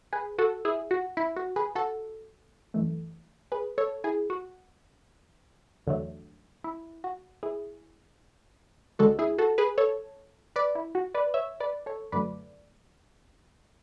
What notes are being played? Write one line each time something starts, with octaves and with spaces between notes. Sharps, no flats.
G#4 B4
F#4 A4
E4 G#4
F#4
E4
F#4
G#4 B4
F#4 A4
F#2 E3 A3
G#4 B4
A4 C#5
E4 G#4
F#4
E2 D3 F#3 A3
E4
F#4
E4 G#4
D2 D3 G#3 F#4 A4
E4 G#4
F#4 A4
G#4 B4
A4 C#5
B4 D5
E4
F#4
B4 D5
C#5 E5
B4 D5
A4 C#5
F#2 D3 F#3 A3 B4 D5